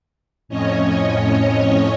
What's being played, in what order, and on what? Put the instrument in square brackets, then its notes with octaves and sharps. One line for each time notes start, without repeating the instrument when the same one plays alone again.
[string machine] F2 A2 C#4 C#5 D#5